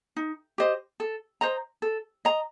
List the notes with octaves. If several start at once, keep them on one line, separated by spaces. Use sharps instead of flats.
D#4
G4 C5 D#5
A4
C5 D#5 A#5
A4
D#5 A#5